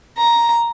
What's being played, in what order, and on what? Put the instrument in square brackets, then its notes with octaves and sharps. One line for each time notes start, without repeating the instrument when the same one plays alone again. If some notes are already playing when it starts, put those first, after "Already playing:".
[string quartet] A#5